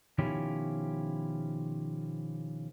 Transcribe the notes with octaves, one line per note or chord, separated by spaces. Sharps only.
B2 D#3 F3 C#4 E4 G4